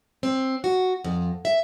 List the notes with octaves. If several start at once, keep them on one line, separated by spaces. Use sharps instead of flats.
C4
F#4
F2
E5